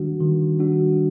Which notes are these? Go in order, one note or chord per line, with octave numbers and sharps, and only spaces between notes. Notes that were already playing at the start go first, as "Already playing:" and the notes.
Already playing: D#3 G3 D4 F#4
D#3
G3 D4 F#4